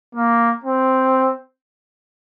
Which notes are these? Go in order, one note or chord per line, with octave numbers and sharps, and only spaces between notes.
A#3
C4